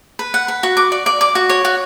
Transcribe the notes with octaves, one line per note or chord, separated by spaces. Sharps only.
B4
F#5
B4
F#4
D6
D5
D5
D6
F#4
C#5
F#4